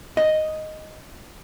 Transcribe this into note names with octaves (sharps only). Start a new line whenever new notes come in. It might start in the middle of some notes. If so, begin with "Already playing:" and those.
D#5